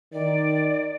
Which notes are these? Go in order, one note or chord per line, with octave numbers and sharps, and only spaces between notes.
D#3 D5